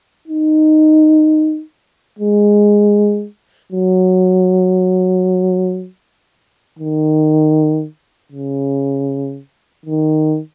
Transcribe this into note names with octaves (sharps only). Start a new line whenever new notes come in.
D#4
G#3
F#3
D#3
C#3
D#3